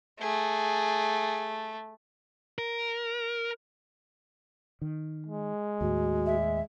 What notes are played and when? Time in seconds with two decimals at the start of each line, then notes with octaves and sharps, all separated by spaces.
0.21 A3 G#4
2.58 A#4
4.82 D#3
5.27 G#3
5.81 D#2 A2 F#4
6.26 E5